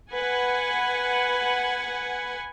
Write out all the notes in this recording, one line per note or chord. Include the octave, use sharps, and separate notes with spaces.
B4 F#5 G#5